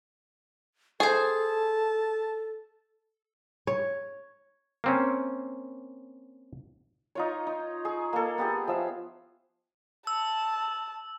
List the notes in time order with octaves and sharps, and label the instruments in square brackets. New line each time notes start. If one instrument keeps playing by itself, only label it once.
[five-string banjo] G#4 C5 [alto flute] A4 [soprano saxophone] A5
[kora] C#5
[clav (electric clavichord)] A#3 C4 C#4
[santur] D#4 F4 C#5
D#4
G#4
A#3 A4
B3 G4 G#4
F3 E5 F5
[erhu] A5 [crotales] E6